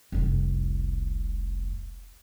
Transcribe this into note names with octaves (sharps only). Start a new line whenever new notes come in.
F1 C2